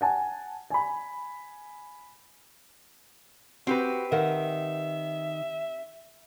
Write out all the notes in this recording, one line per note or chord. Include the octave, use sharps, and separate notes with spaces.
F#5 G#5 A5
G#5 B5
C4 F#4 G4 B4
D#3 A#4 E5 F#5